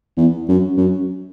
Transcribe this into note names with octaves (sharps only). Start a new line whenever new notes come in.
E2
F#2
F#2